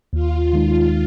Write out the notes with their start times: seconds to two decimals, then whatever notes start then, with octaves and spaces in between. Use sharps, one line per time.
0.13 D#2 F4
0.53 D#3 G#3 D#4